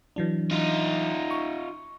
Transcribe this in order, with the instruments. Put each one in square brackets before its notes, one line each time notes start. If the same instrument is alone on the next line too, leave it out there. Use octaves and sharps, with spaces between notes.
[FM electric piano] E3 F#3 D4
[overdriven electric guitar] D#4 F4
[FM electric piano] C#6